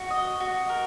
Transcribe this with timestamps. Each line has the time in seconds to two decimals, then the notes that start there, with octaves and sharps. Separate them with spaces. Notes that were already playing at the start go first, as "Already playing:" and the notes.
Already playing: F#4
0.11 D#5
0.40 F#4
0.69 A#4